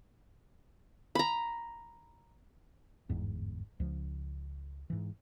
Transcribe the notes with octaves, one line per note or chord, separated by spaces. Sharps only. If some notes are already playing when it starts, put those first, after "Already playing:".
A#5 B5
G1 E2 G#2
C#2 F3
G#2 E3